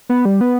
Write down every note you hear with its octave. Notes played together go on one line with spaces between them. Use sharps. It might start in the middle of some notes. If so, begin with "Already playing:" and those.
B3
G3
B3